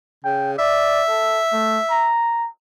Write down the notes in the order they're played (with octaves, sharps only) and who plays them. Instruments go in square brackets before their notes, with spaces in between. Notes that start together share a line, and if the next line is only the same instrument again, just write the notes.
[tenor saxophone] C#3 [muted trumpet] G5
[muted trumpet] D5 [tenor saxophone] E5
[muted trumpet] A4
A3
A#5